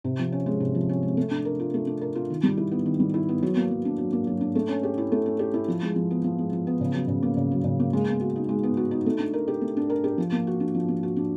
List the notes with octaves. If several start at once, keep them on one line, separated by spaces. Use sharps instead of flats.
C3
F3
C#4
G#3
C3
F3
C#4
G#3
A3
D4
A#4
F4
A3
D4
A#4
F4
D#3
G3
E4
B3
D#3
G3
E4
B3
F#3
A#3
F#3
D4
F#3
A#3
F#3
D4
A3
C#4
G4
E4
A3
C#4
G4
E4
F3
G#3
F3
B3
F3
G#3
F3
B3
C#3
F#3
C#3
A#3
C#3
F#3
C#3
A#3
G#3
B3
F#4
D#4
G#3
B3
F#4
D#4
A3
D4
A#4
G4
A3
D4
A#4
G4
F3
A#3
F#4
D4
F3
A#3
F#4
D4